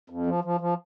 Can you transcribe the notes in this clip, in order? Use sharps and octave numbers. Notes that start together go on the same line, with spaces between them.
F2
F3
F3
F3